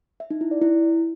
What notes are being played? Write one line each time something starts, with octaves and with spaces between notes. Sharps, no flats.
E5
D#4
E4
D5
E4